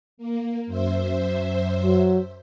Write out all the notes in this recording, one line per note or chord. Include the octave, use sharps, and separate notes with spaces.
A#3
F#2 C5 E5
F#3